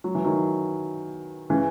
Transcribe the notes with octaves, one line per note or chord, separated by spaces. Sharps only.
F#3
E3
D#3 F#3
C#3 E3